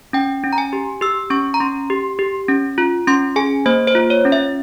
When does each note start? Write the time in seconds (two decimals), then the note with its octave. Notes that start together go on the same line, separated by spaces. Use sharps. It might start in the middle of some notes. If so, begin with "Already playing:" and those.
0.13 C#4 G5
0.44 C#4
0.53 A#5
0.58 G#5
0.73 G4
1.01 G4 E6
1.30 C#4 C#6
1.54 A#5
1.60 C#4 C6
1.90 G4
2.19 G4
2.49 C#4
2.78 F4
3.07 C#4 C6
3.36 G#4 G#5
3.66 A#3 C5
3.87 C5
3.95 F4
4.10 C#5
4.25 C#4
4.32 E5